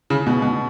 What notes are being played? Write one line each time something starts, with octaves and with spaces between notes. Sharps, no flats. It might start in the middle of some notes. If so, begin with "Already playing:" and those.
C#3
B2
B2